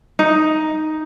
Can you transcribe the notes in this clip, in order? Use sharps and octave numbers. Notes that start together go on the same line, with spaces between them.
D#4